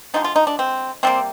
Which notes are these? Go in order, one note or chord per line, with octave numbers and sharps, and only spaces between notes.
D3 F3 G#3 D#4
F4
D#4
D4
C4
C3 G3 A#3 C4